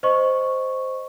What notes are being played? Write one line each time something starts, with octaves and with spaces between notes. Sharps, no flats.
C5 D#5 C#6